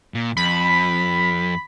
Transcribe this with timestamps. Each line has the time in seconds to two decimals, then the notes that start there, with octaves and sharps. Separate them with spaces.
0.14 A#2
0.37 F2 B5